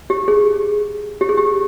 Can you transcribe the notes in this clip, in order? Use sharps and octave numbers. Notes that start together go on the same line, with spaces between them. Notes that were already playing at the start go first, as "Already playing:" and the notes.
G4
G#4
G4
G#4
G4